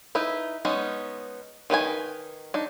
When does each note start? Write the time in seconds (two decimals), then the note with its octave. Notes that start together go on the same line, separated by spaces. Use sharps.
0.15 D#4 E4 B4
0.65 G#3 B3 C#4 D#4
1.70 D#3 D#4 B4 G#5
2.54 D4 D#4